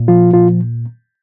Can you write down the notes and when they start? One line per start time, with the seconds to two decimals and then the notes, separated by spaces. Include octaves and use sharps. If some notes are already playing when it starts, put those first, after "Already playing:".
Already playing: A#2
0.08 F3 F4
0.34 A#2 F4